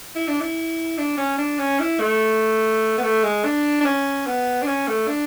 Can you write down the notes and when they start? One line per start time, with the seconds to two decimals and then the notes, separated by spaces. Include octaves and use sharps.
0.15 E4
0.28 D4
0.40 E4
0.98 D4
1.17 C#4
1.38 D4
1.59 C#4
1.80 E4
2.00 A3
2.98 B3
3.03 A3
3.24 G#3
3.44 D4
3.81 D4
3.85 C#4
4.26 B3
4.62 D4
4.67 C#4
4.88 A3
5.08 D4